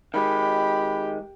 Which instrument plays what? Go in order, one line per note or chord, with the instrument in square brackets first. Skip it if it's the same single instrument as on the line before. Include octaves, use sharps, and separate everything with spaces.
[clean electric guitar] D#3 G#3 [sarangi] G4 [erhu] B5